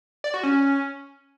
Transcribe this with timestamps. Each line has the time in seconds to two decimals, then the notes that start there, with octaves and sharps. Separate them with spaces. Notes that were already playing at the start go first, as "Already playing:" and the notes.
0.24 D5
0.34 F#4
0.43 C#4